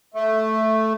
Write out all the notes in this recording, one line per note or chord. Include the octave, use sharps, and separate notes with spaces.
A3